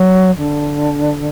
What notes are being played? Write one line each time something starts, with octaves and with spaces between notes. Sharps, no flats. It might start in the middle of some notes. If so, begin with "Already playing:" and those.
Already playing: F#3
D3